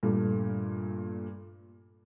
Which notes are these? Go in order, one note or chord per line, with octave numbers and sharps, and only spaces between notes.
G2 A#2 A3